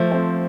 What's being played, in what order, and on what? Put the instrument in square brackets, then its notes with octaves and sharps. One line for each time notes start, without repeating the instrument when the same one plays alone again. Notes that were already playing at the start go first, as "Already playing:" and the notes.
Already playing: [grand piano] F3 A3
A3 C4